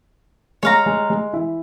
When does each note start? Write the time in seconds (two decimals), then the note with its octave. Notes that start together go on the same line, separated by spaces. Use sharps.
0.63 G#3 C#5 F5 A#5
0.86 G#3
1.10 G#3
1.33 E3 E4